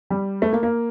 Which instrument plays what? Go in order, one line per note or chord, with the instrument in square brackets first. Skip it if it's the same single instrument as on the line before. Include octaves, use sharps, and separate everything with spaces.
[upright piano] G3
A3
A#3
A#3